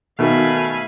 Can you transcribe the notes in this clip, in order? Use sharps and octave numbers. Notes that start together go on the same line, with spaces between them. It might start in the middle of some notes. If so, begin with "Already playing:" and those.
B2 D#3 A3 F5 G#5 B5